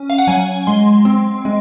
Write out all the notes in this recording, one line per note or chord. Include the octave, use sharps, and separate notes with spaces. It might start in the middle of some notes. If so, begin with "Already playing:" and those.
Already playing: C#4
F5
F#5
F#3 G#5
G#3 C6
C4
G#3